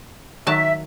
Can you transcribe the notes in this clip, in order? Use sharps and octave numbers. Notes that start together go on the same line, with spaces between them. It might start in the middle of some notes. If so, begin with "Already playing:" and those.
D#3 F#3 E5 A5